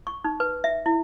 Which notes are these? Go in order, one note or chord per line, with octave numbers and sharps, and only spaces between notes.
C#6
D#4
B4
E5
E4